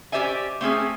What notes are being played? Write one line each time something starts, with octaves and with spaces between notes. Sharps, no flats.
C#4 G4 C5 D5 E5 G#5
A3 C4 C#4 G#4